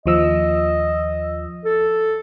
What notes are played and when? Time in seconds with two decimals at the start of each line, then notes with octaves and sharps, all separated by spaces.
0.06 D#2 F3 D#5 E6
1.65 A4